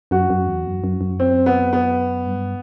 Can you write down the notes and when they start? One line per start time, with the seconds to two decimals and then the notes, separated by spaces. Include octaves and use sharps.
0.11 F#2 F#4
0.30 F#2
0.47 E2
0.66 F#2
0.84 F#2
1.01 F#2
1.20 C4
1.46 B3
1.73 B3
2.26 G2